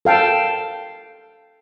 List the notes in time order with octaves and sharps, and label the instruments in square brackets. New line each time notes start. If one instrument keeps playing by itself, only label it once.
[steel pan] A4 F5 G5 A5